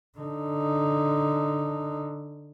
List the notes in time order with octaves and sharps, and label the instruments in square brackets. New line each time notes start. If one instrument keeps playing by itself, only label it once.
[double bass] D3 D#4